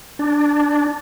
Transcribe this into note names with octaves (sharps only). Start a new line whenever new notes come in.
D4